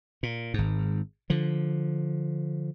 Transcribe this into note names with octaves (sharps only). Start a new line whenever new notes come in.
A#2
G#1 G#2
D3 F3